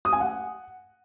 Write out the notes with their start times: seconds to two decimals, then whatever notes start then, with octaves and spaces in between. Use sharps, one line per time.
0.05 D#6
0.13 G#5
0.20 F#5